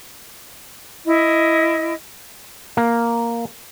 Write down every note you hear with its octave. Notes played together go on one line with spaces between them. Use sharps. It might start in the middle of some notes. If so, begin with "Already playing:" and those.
E4 D#5
A#3